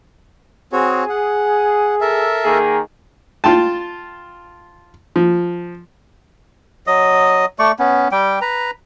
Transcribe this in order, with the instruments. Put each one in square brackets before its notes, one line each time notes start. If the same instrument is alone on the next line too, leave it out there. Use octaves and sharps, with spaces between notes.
[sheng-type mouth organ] C4 F#4 C#5 [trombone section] G#4
[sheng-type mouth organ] F#5
A4 A#4 E5
[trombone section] D#3 A#3 G#4
[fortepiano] F4 G5 A5
F3
[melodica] F#3 D#5 D#6
A3 D5 C#6
B3 C#4
G3 G5
B4 A#5